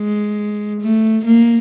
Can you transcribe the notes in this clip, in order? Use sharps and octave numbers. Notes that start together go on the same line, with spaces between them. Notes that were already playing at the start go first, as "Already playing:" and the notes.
Already playing: G#3
A3
A#3